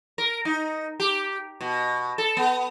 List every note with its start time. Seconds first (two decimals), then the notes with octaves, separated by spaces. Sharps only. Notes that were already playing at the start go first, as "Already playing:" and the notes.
0.18 A#4
0.45 D#4
1.00 G4
1.61 B2
2.18 A4
2.37 B3